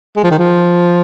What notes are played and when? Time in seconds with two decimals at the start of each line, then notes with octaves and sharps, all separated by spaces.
0.16 G#3
0.24 F3
0.31 D#3
0.39 F3